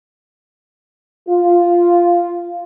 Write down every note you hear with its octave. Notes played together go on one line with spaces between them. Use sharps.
F4